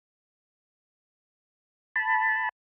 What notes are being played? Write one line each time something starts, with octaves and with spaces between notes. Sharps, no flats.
A5 B5